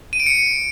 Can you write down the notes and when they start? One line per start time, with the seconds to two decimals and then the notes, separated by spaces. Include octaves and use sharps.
0.13 D#7
0.20 D7
0.26 C#7